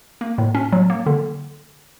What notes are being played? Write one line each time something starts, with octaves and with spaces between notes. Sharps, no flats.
A#3
A2
C#4
F#3
A#3
D3